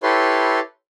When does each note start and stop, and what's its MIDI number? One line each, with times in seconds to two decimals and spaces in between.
0.03 0.59 64
0.03 0.59 67
0.03 0.59 69
0.03 0.59 71
0.03 0.59 73
0.03 0.59 84